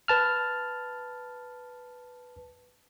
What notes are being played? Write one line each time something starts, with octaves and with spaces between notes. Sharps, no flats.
B4 A5 F6